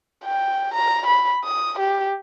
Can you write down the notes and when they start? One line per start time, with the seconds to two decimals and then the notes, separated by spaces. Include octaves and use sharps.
0.24 G5
0.74 A#5
1.06 B5
1.44 D#6
1.79 G4